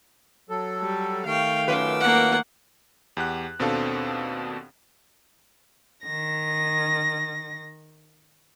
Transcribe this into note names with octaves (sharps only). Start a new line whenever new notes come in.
F#3 A4
G3
D#3 A3 F5 G5 C#6
F#2 F4 B4 D6 E6
A#3 F#5
E2 G4 F#5 F#6
D#2 B2 C4 D4 A4 F5
D#3 A#6